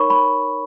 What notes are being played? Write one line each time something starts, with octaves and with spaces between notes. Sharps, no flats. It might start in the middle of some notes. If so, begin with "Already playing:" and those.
Already playing: D#4 A#4 C#5 B5 C#6
B5